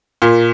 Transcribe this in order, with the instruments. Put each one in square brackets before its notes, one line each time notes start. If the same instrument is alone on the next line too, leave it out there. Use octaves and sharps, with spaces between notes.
[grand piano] A#2